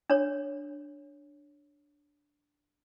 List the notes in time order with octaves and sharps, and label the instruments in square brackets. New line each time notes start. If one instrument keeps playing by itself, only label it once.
[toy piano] D4 C#5